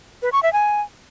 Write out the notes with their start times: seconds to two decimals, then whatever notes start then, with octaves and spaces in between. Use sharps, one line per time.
0.22 B4
0.33 C#6
0.43 E5
0.53 G#5